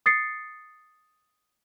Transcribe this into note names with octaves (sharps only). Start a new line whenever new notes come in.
D#6 A6 C7 C#7